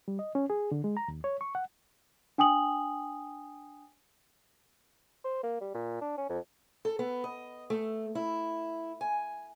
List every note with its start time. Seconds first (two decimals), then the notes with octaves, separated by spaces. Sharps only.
0.08 G3
0.19 D#5
0.35 C#4
0.50 G#4
0.71 D3
0.84 G#3
0.97 A#5
1.08 D#2
1.24 C#5
1.41 C#6
1.55 F#5
2.38 D4 G5 G#5 D#6 F#7
5.24 C5
5.43 A#3
5.61 G3
5.74 A#2
6.01 D4
6.18 C#4
6.30 F2
6.85 A4
6.99 B3
7.24 D#5
7.70 A3
8.15 E4
9.01 G#5